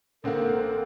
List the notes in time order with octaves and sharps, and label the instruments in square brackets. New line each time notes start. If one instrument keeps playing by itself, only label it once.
[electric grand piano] A1 C4 F#5 [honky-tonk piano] D3 A#3 [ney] A4 [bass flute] A#4